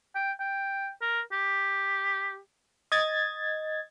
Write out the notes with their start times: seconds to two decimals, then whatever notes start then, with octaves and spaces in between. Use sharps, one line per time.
0.15 G5
0.40 G5
1.01 A#4
1.32 G4
2.92 D#5 G#6 A6